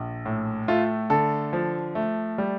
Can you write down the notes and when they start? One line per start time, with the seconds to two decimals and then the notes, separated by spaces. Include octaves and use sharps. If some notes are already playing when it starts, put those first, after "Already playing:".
Already playing: A#1
0.26 A2
0.68 A3 F4
1.10 D3 A4
1.53 F3
1.95 A3
2.38 G3